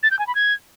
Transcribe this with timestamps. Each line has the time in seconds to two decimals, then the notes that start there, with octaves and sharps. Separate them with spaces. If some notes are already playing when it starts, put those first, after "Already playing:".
0.03 A6
0.11 G6
0.19 G#5
0.27 B5
0.35 G#6